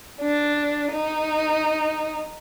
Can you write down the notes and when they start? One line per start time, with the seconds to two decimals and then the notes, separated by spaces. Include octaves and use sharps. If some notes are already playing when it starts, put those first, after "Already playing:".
0.21 D4
0.91 D#4